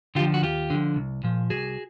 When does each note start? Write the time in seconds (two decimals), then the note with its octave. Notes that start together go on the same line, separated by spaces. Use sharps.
0.15 D3 F4 G4
0.20 F3
0.34 F#4
0.43 D#2 F4 G4
0.70 D3 F3
0.96 C2
1.24 A#2 F3
1.50 C2 F#4 G#4